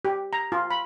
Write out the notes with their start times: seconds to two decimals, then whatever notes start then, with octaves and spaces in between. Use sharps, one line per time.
0.05 G4
0.33 A#5
0.52 F4
0.71 B5